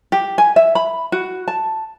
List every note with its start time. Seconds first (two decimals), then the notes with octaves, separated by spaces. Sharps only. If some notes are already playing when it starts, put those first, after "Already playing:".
0.12 G4
0.38 G#5
0.56 E5
0.75 B5
1.12 F#4
1.48 A5